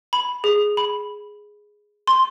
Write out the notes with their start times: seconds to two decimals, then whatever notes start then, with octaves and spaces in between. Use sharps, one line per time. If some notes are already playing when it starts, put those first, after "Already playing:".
0.13 B5
0.44 G#4
0.77 B5
2.07 C6